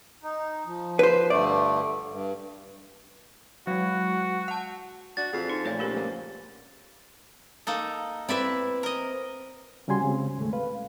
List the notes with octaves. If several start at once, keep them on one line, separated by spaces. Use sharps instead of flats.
D#4
F3
B4 C5
G2 D3 A3 D5
G2
F#3 G#3 F#4
F#5 A5
D4 F#4 A6
F2 F3 G#4
D#4
A#2 F3 A3 C#5 F5
C#2 D4 G4 A#4
A#3 B3
A#3 D#4 A4
C4 E4 B4 D5 E5
A#4 D#5
D2 C#3 G3 F#4 G#5 C6
C#3 G#3 C4
D#2 A2 G#3 A3
B4 F5